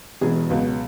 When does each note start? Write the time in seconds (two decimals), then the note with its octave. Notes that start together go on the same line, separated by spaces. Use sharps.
0.21 E1 E2 B2 G#4
0.50 C#2 B2 F#3